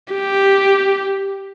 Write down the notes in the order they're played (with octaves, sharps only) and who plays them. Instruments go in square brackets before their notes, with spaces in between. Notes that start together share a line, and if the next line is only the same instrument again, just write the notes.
[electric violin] G4